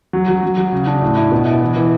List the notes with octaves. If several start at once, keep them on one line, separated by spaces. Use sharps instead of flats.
F#3
F#3
F#3
F#3
C#3
D4
A2
E4
B2
E4
E3
E3